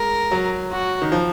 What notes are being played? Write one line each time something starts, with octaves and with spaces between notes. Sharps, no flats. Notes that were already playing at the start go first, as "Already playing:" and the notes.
Already playing: G#3 A#4
F#3
F#4
D#3
F3